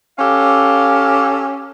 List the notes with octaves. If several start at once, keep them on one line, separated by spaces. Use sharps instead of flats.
C#4 G4 A4 F5